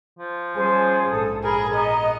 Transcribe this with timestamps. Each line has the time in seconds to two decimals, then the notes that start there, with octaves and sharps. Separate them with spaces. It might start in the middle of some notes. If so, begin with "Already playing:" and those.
0.19 F3
0.55 G3 C#4 G#4 C5 G#5
1.08 A#1 G#2 A4 D#6
1.44 G#4 A#4 B5
1.75 B3 D#5 A#5